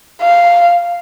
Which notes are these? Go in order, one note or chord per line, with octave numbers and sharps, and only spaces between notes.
F5